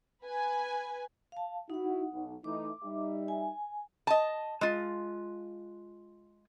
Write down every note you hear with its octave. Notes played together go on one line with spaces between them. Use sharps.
B4 G#5
F5 A5
D#4 E4 F#4 F#5
B1
E3 A3 D#4 D6
G3 D#4 E5
G#5
D#5 A5
G#3 F4